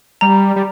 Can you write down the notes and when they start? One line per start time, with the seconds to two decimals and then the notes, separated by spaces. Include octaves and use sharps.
0.21 G3 A#5
0.56 G3